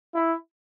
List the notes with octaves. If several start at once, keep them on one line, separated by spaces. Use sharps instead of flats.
E4